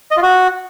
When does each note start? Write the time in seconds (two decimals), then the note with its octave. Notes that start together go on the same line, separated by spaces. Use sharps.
0.11 D#5
0.17 F4
0.22 F#4